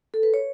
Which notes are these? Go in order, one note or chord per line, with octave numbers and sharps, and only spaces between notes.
A4
B4
C#5